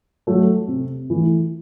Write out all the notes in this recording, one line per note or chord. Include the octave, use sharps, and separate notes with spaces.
F#3 A3
C3
E3 A3